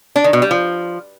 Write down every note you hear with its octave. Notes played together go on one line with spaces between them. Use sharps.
D4
D#3
B2
G3
F3